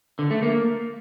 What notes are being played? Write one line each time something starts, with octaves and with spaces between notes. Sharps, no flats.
D3
A3
A#3